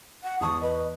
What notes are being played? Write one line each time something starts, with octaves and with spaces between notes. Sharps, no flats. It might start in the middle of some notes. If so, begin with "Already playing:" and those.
F#5
E2 A5 C#6 D#6
B4 D#5